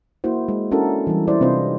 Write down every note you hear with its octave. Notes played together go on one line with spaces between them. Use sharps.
A#3 E4 F#4 C5
G#3
C#4 D4 E4 F#4 A4 A#4
E3 G3
E4 G4 B4 C5 D5
C3 C4 D4 F4 C5 D#5